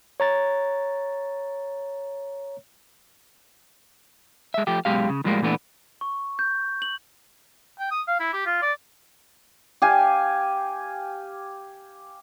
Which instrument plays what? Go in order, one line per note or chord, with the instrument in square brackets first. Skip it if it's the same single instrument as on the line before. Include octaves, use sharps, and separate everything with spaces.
[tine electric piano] C#5 A#5 A6
[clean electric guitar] G#3 E5
F3 A3 G4
F#2 B2 G#3 G4 F5
C#3
A2 F3 G3 G#3 A#3
A#2 E3 A3 B3 D4
[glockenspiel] C#6
G6
F#7
[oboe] G5
D#6
F5
E4
G4
F4
D5
[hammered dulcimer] G4 F5 G#5